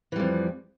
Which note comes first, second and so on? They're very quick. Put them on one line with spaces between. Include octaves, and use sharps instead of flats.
E3 G3 F2